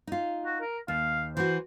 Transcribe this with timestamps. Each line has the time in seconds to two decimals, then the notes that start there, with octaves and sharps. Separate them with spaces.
0.07 D#4 F4
0.46 F#4
0.60 A#4
0.88 D#2 F5
1.37 E3 F#4 C5